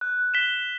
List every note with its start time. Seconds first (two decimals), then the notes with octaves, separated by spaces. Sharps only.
0.01 F#6
0.34 B6 E7 G7